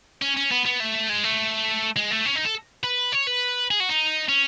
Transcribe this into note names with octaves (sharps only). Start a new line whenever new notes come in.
C#4
C#4
B3
B3
A3
G#3
A3
G#3
A3
C#4
D#4
A4
B4
C#5
B4
G#4
F#4
D#4
C#4